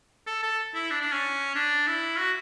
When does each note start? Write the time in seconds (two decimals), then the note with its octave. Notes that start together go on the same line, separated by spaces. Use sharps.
0.27 A4
0.43 A4
0.74 E4
0.91 D4
1.01 D4
1.12 C#4
1.55 D4
1.87 E4
2.19 F#4